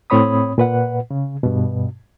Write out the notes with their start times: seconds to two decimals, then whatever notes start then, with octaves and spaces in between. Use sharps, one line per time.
0.10 A2 C4 C#5 B5 D#6
0.58 A#2 B4 F#5
1.11 C#3
1.43 G2 B2